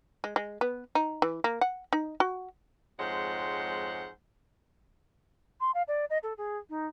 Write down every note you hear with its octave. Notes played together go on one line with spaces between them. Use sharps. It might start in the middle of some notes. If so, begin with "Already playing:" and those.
G#3
G#3
B3
D#4
E3
A#3
F#5
D#4
F#4
F2 G#2 G#3 C5 C#5 F#5
C6
F5
D5
D#5
A4
G#4
D#4